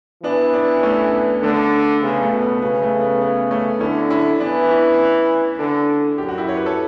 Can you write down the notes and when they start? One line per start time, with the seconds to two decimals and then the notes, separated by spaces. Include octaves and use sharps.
0.24 E3 B3 D4
0.54 B3 D4
0.79 D4
0.83 A3 C#4
1.14 B3
1.43 D3 A3
2.02 C#3 B3
2.22 A3
2.32 B2
2.42 B3
2.62 C#3 B3
2.82 A3
3.01 B3
3.22 B3
3.51 A3 C#4
3.80 D3 C#4 E4
4.10 C#4 E4
4.40 E3 B3 D4
4.70 C#4 E4
5.59 D3
6.18 F#2 G4
6.29 F#4
6.38 E4 G4
6.48 C#5
6.57 B4
6.66 A4 C#5